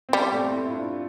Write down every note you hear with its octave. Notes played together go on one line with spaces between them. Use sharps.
C4
G3 B3
A3 C4
C4 E4
E4
D4 F4